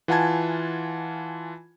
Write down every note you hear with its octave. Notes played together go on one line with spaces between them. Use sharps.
E3 F4 F#5 G#5 A5 G#6